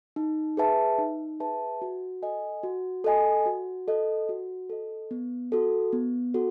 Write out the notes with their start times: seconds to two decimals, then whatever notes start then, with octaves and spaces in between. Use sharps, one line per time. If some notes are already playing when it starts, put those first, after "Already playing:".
0.16 D#4
0.57 G#4 B4 E5 A5
0.99 D#4
1.40 G#4 B4 E5 A5
1.82 F#4
2.22 A4 D#5 G#5
2.63 F#4
3.04 A4 D#5 G#5
3.46 F#4
3.88 A4 D#5
4.29 F#4
4.70 A4 D#5
5.11 B3
5.52 F#4 A4
5.93 B3
6.34 F#4 A4